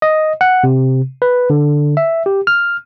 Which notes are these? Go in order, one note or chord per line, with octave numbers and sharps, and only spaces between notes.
D#5
F#5
C3
B4
D3
E5
G4
F6